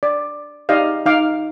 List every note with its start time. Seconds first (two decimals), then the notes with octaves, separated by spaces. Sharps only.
0.03 D5
0.69 D#4 G4 D5 D#5 F5
1.06 D#4 F5 D6